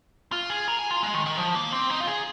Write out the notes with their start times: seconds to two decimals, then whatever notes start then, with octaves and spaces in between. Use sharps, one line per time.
0.32 F4
0.50 G#4
0.68 A#4
0.79 G#4
0.91 F4
1.03 G#3
1.14 D#3
1.26 D#3
1.37 F3
1.55 A#3
1.72 C4
1.90 D#4
2.00 F4
2.07 G#4